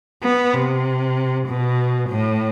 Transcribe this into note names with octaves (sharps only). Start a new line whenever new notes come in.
B3
C3
B2
A2